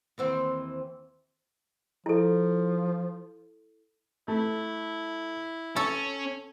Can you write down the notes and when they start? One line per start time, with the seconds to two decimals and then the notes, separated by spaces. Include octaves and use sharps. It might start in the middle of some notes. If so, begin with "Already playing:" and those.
0.18 D#2 E3 C4
2.06 F3 E4 A4
4.28 A3 E4
5.76 C#4 A4 C#6